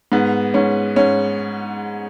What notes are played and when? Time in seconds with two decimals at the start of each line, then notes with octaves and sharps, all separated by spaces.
0.12 G#2 B3
0.54 G#2 C#4
0.96 G#2 C#4